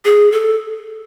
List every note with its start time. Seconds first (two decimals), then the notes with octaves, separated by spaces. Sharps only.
0.05 G#4
0.32 A4